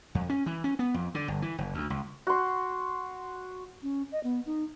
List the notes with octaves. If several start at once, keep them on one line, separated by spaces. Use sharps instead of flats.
F2
C#4
E3
C#4
B3
F2
D3
G1
E3
F#1
D2
C#2
F#4 C6
C#4
D#5
B3
D#4